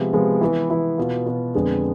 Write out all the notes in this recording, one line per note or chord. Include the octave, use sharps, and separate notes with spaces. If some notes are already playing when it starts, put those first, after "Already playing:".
Already playing: C3 F3 G#3 B3
C3 F3 G#3 B3
E3 B3 E4
E3 B3 E4
B2 B3 F4
B2 B3 F4
F2 D3 G#3 B3